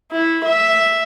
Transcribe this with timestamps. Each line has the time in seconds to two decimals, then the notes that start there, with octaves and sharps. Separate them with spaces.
0.12 E4
0.45 E5